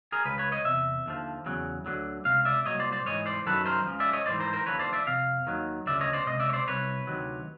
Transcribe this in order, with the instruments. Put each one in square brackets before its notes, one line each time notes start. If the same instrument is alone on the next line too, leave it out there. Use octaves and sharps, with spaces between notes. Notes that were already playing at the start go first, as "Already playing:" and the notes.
[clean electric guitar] G#4 A#4
C#2 C#3 B4
B4 C#5
C#5 D#5
E2 C3 E5
D#2 D3 F3
E2 C#3 F#3
D2 D3 F#3
C#2 C3 F5
D5 E5
C2 A#2 F#3 C#5 D#5
C5 D5
C5 D5
G#2 E3 C#5 D#5
C5 D5
F#2 D#3 F#3 A4 B4
A#4 C5
C#2 C#3 F3
D5 E5
C#5 D#5
G#2 E3 C5 D5
A#4 C5
A#4 C5
D#2 D3 F3 B4 C#5
C5 D5
D5 E5
F2 C3 F5
D#2 D#3 F#3
D2 C#3 F3 D5 E5
C#5 D#5
C5 D5
C#2 C3 D#5
D5 E5
C#5
C5 D5
C2 C3 B4 C#5
D2 C3 D#3 F#3